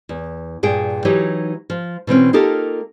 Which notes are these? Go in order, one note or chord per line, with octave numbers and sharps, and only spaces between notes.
E2
G2 A#2 G#4 G5
E3 F#3 D#4 G4 C#5
F3
B2 E3 C4 C#4
A#3 D#4 F4 G4 A4 A#4